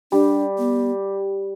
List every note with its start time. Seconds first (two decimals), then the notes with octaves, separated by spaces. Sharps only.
0.12 G3 D4
0.58 B3